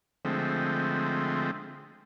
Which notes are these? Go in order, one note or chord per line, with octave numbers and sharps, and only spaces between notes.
D3 F3 G#3 A3 C4